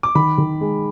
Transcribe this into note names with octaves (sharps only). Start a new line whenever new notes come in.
D6
D#3 B5
D#3
G#3